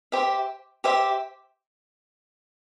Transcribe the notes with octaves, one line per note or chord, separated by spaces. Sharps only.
G4 C5 E5
G4 C5 E5